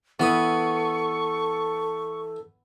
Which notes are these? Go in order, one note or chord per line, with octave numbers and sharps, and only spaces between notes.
E3 B3 A4 B5 C#6 D#6